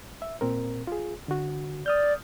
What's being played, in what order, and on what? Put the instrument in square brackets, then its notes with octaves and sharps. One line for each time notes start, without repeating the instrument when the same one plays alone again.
[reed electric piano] E5
A#2 C4 A#4
F4 G#4
D3 F#4
[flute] D5 [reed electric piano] D#6 F6 G6